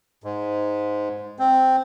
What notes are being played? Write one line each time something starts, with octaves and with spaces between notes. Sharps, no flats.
G#2
C4